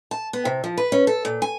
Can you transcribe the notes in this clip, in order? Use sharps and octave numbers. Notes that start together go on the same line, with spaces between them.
A5
B3
C3
F3
B4
C#4
A4
A#2
G#5